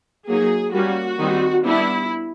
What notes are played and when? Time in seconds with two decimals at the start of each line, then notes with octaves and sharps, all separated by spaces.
0.28 F#3 A#3 D#4 G#4
0.73 G3 A#3 C#4 F#4
1.19 D#3 G3 C4 D#4
1.64 G3 B3 D4 E4